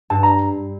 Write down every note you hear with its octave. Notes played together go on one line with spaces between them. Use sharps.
G2 A5
A#5